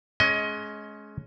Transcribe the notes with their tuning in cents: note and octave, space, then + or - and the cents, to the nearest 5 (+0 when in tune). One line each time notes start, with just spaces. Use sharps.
G#3 +25 C#4 +0 D#5 +25